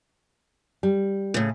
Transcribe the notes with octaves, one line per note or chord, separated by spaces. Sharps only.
G3
A2 C#3